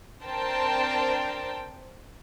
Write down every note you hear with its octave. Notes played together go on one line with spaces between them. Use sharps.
C4 D4 A#4 C5 G5 A5